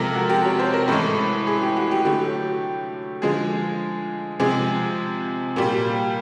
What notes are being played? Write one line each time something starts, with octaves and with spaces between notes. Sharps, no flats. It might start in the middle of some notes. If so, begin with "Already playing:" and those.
Already playing: C3 F3 G#3 A4 A#4
F#4
G4
C#5
C5
A#4
A2 E3 G#3 A4
G#4
G4
F#4
G4
D3 F#3 A3 G4
D3 F3 G#3 G#4
C3 F3 G#3 G#4
A#2 G3